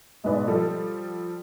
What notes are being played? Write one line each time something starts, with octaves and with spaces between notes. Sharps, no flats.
B1 G#2 G#3 B4 D5
F3 G3 A4